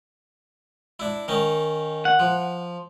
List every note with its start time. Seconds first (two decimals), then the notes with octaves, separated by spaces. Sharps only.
0.99 D4 E4
1.28 D#3 C#4 D#4
2.05 F#5
2.19 F3